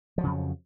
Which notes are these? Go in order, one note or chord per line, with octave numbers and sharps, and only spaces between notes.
F2 C#3 F3 F#3